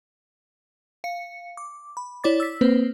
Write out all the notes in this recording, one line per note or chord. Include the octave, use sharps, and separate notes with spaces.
F5 C#7
D6
B5
E4 C#5 D5 D6 A6
E6 B6
A#3 C4 B4 C5